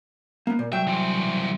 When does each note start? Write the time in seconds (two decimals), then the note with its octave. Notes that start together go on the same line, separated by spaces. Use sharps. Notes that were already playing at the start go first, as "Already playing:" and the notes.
0.47 A#3 B3
0.59 A#2
0.72 C2 F#3 E5 G5
0.87 E3 C4